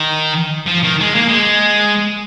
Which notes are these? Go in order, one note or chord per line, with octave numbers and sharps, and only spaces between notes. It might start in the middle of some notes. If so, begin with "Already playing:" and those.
Already playing: D#3
F3
D#3
G#3
A#3
G#3